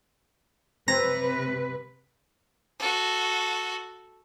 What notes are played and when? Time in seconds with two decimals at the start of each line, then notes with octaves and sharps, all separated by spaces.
0.88 C3 C4 B4 A#5
2.79 F#4 A4